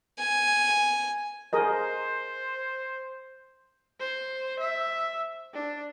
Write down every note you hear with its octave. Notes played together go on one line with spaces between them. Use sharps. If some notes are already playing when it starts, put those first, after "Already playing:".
G#5
G#4 A#4 C5 D#5
C5
E5
D4